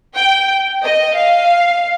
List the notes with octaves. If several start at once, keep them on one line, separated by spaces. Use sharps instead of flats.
G5
D#5
F5